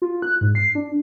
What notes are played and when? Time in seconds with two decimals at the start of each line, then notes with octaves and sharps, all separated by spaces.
0.02 F4
0.22 F#6
0.41 G#2
0.55 C7
0.75 D4